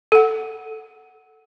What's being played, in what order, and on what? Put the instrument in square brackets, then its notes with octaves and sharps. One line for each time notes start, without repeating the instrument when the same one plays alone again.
[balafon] A4 F#5